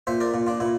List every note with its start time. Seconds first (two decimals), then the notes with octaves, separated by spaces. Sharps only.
0.07 A#2 C5 E5
0.20 A#4 D5
0.34 A#2
0.47 D4 F4
0.60 A#2 E4